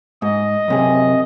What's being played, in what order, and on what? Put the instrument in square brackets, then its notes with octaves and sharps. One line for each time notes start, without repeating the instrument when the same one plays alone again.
[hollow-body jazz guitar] G#2 [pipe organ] D#5
[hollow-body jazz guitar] F#2 C3 G#4